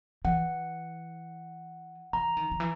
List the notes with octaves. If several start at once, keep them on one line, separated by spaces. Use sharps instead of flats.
E3 F#5
E3 A#5
D#3
D#3
E3